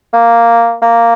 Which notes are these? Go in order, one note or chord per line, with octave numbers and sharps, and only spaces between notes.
A#3
A#3